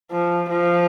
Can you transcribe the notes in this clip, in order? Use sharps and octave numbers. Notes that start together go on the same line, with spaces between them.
F3
F3